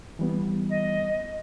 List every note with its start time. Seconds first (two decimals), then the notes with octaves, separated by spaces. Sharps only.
0.19 E3 G3 B3
0.69 D#5